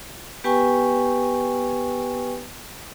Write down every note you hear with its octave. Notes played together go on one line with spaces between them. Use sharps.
B3 G4 B4 G5 G#5 C#6